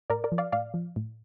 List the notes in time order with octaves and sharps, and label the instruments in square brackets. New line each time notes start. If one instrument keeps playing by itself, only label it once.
[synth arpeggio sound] A2 A#4 D5
A#4 D5
F3
D5 F5
A2 D5 F5
F3
A2